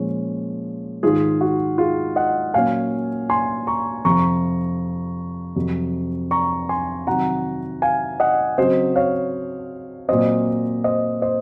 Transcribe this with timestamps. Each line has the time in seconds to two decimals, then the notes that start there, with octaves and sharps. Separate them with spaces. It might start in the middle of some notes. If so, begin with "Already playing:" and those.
Already playing: A#2 F3 G#3 C#4
1.03 G#2 D#3 G#3 F4 G#4
1.41 F#4
1.78 F4 G#4
2.16 D#5 F#5
2.54 A#2 F#3 A#3 C#4 F5 G#5
3.30 G#5 C6
3.67 A#5 C#6
4.05 F2 C3 F3 A#5 C#6
5.56 F2 C3 F#3
6.31 A#5 C#6
6.69 G#5 C6
7.07 C3 D#3 F#3 C4 F#5 A#5
7.82 F5 G#5
8.20 D#5 F#5
8.58 C#3 F#3 C4 C5 D#5
8.96 C#5 F5
10.08 A#2 F#3 C4 C5 D#5
10.84 C5 D#5
11.22 C5 D#5